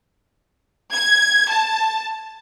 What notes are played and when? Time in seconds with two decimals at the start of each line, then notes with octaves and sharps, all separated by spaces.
0.93 G#6
1.50 A5